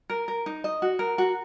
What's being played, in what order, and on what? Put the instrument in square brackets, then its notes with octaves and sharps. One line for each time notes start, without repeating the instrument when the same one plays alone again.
[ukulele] A#4
A#4
D#4
D#5
F#4
A#4
F#4